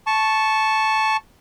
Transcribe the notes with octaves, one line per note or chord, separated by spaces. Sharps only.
A5 C#6